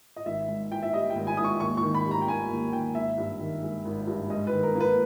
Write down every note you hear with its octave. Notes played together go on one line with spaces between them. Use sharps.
D#5
G#1 E5
G#2
E3 G5
E5
G3 D#5
G5
G#1
G#5
G#2 D#6
C#6
D#2 C#6
C#6
D#3
B5
G3
A#5
G5
A#3 G#5
D#2
D#3 G5
G#1 E5
G2
D#3
G#3
G#1
G2
G#2 D#5
B4
D#3
A#4
A#3
B4